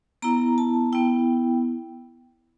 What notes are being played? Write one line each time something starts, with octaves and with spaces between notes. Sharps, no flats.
B3 E4 A#5
A5
B3 E4 G5